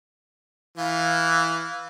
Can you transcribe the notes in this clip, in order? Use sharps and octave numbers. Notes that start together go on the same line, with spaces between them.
E3 F5